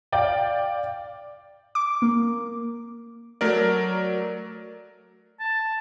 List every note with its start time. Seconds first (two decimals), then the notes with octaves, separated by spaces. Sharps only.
0.12 D5 F5 G5
1.75 D6
2.02 A#3
3.41 F#3 A3 A#4 D5
5.40 A5